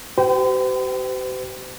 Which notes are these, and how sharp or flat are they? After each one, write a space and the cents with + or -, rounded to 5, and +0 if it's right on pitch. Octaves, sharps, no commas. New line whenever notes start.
G4 -40 C5 -45 G5 +0